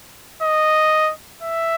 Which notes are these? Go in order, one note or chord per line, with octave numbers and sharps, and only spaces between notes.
D#5
E5